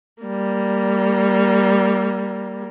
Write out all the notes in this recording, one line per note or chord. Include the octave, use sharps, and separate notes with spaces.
G3 A#3